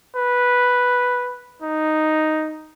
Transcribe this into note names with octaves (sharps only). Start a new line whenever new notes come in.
B4
D#4